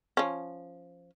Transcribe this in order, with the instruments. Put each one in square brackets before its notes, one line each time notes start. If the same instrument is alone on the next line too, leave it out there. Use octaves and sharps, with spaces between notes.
[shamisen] F3 C#4